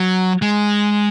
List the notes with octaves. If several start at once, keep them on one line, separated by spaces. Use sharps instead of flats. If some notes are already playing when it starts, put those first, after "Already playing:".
Already playing: F#3
G#3